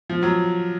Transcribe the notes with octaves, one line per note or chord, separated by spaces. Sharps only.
F3
F#3